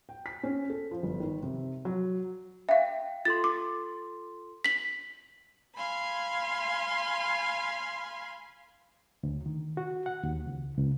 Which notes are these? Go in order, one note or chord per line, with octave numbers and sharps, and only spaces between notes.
G5
B6
C#4
A4
F3
G1
D#3
C3
F#3
E5 F5 G5
F4 A4 C6 A6
D6
B6 F#7
F5 G#5 B5 C6
D2
D#3
F#4
F#5
D#2
C#2
C#2